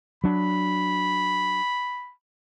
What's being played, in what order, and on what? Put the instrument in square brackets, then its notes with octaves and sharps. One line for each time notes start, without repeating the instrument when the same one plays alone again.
[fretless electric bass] F#3 D4 [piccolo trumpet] B5